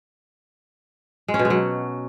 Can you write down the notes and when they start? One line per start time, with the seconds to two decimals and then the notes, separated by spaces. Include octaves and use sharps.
1.28 G#3
1.34 C#4
1.39 B2
1.45 G#3
1.50 F#3